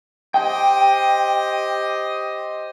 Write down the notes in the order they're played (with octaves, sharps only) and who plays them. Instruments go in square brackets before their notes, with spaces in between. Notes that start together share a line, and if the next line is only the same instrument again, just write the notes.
[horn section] G4 C5 D#5 [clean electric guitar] G5